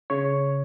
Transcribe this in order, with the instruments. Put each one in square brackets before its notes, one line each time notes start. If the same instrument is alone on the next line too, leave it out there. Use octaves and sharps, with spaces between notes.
[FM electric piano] C#3 C#5